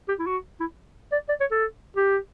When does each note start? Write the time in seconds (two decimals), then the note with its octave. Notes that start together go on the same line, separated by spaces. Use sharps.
0.09 G4
0.19 E4
0.26 F#4
0.60 E4
1.12 D5
1.29 D5
1.40 C#5
1.51 A4
1.96 G4